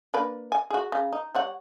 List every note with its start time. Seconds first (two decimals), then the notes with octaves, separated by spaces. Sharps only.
0.14 A#3 D4 B4
0.52 G#5
0.70 F#4 G#4
0.92 C#3
1.13 D#4
1.35 G3 C#5 F#5